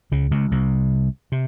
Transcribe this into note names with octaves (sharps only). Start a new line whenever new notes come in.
C#2 C#3
C#2 C#3
C2 C3
C3